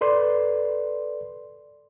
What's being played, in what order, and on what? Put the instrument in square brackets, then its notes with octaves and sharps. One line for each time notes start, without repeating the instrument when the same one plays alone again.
[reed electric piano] A4 B4 D5 C6